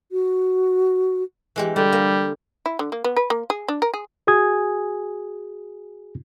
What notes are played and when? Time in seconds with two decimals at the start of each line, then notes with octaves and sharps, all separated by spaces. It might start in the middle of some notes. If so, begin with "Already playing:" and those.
0.12 F#4
1.56 E3 G#3 G4
1.76 D3 G3
1.92 A#3
2.66 E4
2.79 D3
2.92 A#3
3.04 B3
3.16 B4
3.30 A#3
3.50 G#4
3.68 D4
3.82 A#4
3.94 G#4
4.27 F#4 G#4 G#5 D#6 G#6